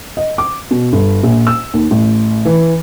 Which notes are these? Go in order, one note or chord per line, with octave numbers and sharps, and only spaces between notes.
D#5
D6
B2
G1
A#1
E6
D#2
A1
E3